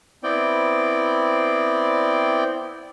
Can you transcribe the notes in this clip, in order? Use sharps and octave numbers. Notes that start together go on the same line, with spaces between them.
B3 C4 E4 D5 G5